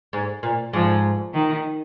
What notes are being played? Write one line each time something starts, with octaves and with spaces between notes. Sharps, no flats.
G#2
A#2
G#2 F3
D#3